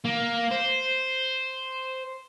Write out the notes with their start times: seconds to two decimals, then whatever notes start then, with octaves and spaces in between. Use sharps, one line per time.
0.05 A#3
0.51 C5